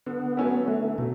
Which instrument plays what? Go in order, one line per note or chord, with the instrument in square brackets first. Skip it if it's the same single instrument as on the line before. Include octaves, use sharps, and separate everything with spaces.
[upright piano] D3 [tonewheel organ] B3
[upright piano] F#3 A3 C#4 E4
[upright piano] D3 [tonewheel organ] A3
[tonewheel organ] B2 [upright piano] F#3 A3